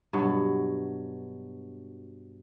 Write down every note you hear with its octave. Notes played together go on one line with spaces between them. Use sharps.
G2 B2 F#3